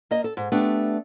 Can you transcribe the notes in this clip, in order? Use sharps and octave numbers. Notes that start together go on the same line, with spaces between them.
A#3 D#5
A4
G#2
A3 B3 D4 G4